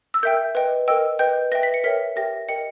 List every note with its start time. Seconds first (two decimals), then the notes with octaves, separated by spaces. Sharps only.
0.14 E6
0.23 A#4 E5 G5 G6
0.55 B4 D#5 G5
0.88 A#4 D#5 G5 E6
1.19 B4 D#5 G5 G6
1.52 B4 E5 G5 A#6
1.63 B6
1.74 C#7
1.84 A#4 C#5 E5 G5 B6
2.16 G4 A#4 E5 G5 A#6
2.48 A#4 D#5 G5 C#7